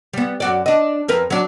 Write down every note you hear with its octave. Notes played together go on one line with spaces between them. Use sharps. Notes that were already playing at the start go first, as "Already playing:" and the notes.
G3 B3
F#2 F#4 D5
D4 D#5
F2 A#4 B4
F#3 D4